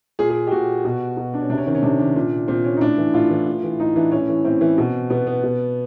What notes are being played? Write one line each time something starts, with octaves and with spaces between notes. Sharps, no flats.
A#2 G#4
G#4
G4
A#2 F#4
B2
B2
D4
C#4
C3 D4
C#4
D#3 C4
C#4
C3 D4
D#3
A#2
A#2 C4
C#4
D#4
A2 D4
E3
A2 F4
E3
A2
E3
A2 D#4
E3 D4
A2 C#4
E3
A2 C4
E3
B2
B2 B3
B3
B2